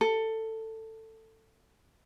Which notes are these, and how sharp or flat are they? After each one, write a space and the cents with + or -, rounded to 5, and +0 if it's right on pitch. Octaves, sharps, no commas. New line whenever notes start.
A4 +15